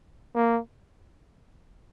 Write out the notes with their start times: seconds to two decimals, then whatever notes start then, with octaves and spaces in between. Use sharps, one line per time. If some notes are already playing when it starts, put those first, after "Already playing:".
0.35 A#3